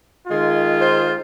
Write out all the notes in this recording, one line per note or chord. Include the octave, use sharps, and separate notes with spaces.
D#3 G#3 F4
C5